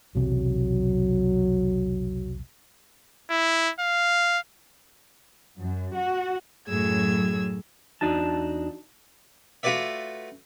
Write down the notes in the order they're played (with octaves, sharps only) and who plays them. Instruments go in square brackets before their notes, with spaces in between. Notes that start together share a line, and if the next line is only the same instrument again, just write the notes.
[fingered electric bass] B1 E2 C3 [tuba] F#3
[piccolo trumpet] E4
F5
[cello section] F#2
F#4
[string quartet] F#2 A2 F#3 G#4 E6 G#6
[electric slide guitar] E2 D4 D#4 F#4 A5
[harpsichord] A3 F4 F#4 B4 D5 E5